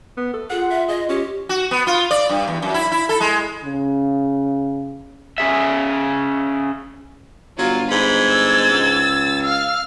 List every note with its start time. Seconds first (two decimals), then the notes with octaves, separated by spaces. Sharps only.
0.17 B3
0.33 A4
0.50 F4 G#4 F#5
0.70 E5
0.88 G#4 D#5
1.09 C#4 G4
1.49 F#4
1.71 B3
1.87 F4
2.11 D5
2.29 G2
2.47 E2
2.62 F#2
2.74 E4
2.92 E4
3.09 A4
3.20 G#3
3.64 C#3
5.38 C#4 G#4 E5
7.58 G1 F#3 F4
7.91 G#2 B5 G#6
8.31 E6 A6
8.72 C#2
9.43 F5 E6 F6